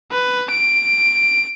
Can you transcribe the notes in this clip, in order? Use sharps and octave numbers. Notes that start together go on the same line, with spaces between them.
B4
D7